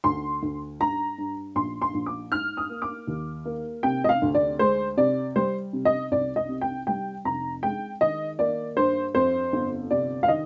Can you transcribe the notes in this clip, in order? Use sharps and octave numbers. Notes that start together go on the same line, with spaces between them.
D2 C6
D2
G2 A#5
G2
A#1 C6
C6
A#1
D6
G#2 F6
D#6
A#3
D6
D#2
A#3
C3 G5
D#5
F5
D2
D5
G#3 C5
C3 D5
G3 C5
C3
D#5
C2 D5
D#5
C3
G5
G3 G5
F1 A#5
G#3 G5
D#3 D#5
A#3 D5
G2 C5
F2 C5
G1
C3 D5
F5
D#3 D#5